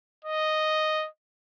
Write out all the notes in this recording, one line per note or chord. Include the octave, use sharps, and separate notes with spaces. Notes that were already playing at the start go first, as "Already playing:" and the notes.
D#5